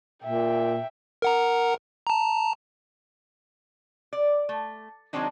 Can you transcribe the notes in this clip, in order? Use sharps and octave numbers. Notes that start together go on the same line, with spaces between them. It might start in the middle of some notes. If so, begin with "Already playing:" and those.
A#2 E5 G5
A#4 F#5 A#5
A5 A#5
D5
A3
D#3 F#3 G#3 C4 D4 D#4